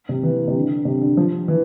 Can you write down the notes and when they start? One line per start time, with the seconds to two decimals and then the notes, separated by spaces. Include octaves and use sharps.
0.09 C3
0.23 E3
0.48 C3
0.55 D3
0.85 C3
1.01 D3
1.17 F3
1.48 E3